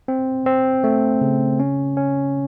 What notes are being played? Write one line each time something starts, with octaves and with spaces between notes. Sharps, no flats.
C4
C4
A3
C#3
C#4
C#4